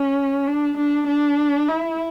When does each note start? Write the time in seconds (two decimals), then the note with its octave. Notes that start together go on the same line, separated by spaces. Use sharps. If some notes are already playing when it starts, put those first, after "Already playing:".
Already playing: C#4
0.47 D4
0.78 D4
1.08 D4
1.68 E4